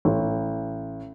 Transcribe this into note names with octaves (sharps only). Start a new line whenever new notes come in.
A1